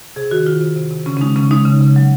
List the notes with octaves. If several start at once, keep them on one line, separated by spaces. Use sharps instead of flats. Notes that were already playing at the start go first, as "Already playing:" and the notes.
C3 G#4
D#3 F#4
D#3 F4
C3
C3
C3
C#3 C#4
C#4
G#3 D#4
C#3 C#4
G#3 D#4
C#3
C#3
F#3